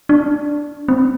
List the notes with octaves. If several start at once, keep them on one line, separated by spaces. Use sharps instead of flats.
D4
C4